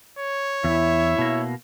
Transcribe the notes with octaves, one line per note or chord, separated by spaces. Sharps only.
C#5
E2 E4 E5
B2 A#3